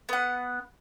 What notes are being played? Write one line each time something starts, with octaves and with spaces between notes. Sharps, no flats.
B3 F#5